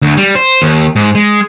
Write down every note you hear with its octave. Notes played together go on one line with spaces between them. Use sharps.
D2
G3
C5
D#2
G#2
G#3